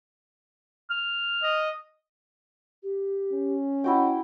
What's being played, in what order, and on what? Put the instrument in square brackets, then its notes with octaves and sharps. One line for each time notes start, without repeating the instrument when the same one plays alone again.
[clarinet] F6
[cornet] D#5
[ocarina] G4
[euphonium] C#4
[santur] E4 F#4 G5 [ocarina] D#5